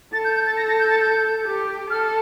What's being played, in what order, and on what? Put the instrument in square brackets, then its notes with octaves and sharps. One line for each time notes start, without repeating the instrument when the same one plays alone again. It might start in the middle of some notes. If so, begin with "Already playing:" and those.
[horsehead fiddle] A4 [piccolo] A6
[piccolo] G6
G6
A6
A#6
A#6
G6
A6
G6
[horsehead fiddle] G4
[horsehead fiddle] A4 [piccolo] F6